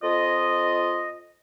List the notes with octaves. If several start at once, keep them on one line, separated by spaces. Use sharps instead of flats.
F2 F4 D#5